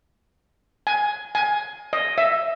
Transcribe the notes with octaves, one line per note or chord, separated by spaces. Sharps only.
G#5
G#5
D#5
E5